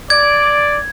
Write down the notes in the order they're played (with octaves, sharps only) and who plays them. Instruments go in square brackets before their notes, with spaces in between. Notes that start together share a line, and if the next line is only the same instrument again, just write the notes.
[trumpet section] D5 [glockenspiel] G#6